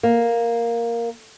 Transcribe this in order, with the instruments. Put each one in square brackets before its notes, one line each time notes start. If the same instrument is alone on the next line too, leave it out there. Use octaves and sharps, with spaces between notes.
[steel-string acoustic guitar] A#3